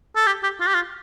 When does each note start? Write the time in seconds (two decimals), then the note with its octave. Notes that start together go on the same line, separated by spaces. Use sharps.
0.16 A4
0.27 G4
0.43 G4
0.60 F4
0.67 G4
0.74 F4